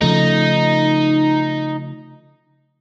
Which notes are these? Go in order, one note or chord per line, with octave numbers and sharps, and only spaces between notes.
C#3 F3 A3 D#4